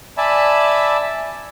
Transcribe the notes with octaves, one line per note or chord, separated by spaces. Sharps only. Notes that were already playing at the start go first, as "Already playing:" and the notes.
D5 E5 G#5 A5 B5